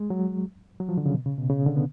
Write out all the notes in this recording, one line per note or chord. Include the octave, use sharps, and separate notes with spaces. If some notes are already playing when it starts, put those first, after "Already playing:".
Already playing: G#3
F#3
F#3
F3
D3
C#3
B2
C#3
B2
C#3
D3
B3